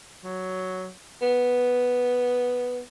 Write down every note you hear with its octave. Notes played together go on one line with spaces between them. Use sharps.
F#3
B3